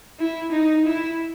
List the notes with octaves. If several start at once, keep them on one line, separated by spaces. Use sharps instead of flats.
E4
D#4
E4